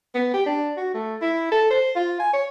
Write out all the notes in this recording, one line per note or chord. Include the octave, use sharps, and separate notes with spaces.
B3
G4
D4
F#4
A3
E4
A4
C5
F4
G#5
C#5